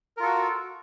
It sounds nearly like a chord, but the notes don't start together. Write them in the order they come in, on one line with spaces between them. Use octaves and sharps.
A#4 F4 A4 F#4